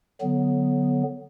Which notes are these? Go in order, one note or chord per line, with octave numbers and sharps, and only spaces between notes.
D3 F#3 B3